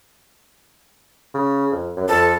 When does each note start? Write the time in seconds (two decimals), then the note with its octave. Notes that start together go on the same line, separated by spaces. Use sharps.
1.34 C#3
1.72 F2
1.97 F#2
2.08 F2 A4